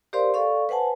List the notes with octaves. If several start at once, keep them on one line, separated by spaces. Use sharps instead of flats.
G4 A#4 C5 D5 F5 C6
A4 D5 F5 C#6
B4 C5 F#5 G#5 A5